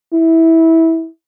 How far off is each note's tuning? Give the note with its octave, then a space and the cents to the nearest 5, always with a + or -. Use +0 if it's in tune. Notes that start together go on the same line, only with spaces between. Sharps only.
E4 -15